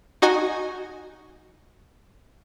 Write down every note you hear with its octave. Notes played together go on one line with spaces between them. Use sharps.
D#4 F#4 D#5 G#5